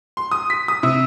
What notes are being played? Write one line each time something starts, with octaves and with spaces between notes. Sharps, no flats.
C6
D#6
B6
D#6
C3